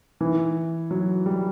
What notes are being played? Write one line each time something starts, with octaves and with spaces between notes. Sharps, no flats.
E3
F#3
G3